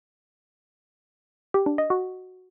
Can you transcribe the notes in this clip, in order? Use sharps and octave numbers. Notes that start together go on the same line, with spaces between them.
G4
D4
D#5
F#4